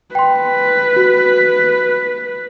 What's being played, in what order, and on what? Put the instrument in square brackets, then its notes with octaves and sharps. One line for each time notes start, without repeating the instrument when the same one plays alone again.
[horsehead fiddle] B4 [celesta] G5 C6
[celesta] F#4